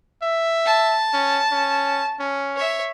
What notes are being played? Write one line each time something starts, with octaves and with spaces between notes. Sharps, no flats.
E5
A5
C#4
C#4
C#4
C#5 E5